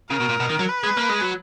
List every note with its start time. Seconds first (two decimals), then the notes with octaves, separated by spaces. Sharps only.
0.10 C#3 A#4
0.20 B2
0.29 A#2
0.40 B2
0.50 D#3
0.59 F#3
0.69 B4
0.84 G#3
0.97 A#3
1.10 G#3
1.22 F#3